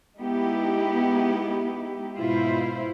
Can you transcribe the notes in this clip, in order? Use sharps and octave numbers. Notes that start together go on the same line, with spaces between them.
G#3 B3 D#4 E4 G4
G#2 B2 E4 F4 C5